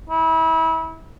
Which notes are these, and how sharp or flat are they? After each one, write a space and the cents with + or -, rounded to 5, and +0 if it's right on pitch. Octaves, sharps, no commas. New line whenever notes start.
E4 -30